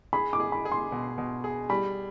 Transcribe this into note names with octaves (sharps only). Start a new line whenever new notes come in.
G#4 B5
D6
G#4
B5
G#4
C6
B2
B2
G#4
G3 B5